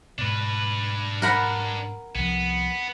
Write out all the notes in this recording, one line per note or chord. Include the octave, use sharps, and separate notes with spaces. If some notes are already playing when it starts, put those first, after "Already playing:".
G#2 B2 D4 B4
A#4 F#5 B5
C2 C3 F3 B3